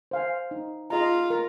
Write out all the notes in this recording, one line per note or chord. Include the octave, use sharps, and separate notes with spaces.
C5 F5 G#5
D#4
F4 G#4 D#5 A#5
A#4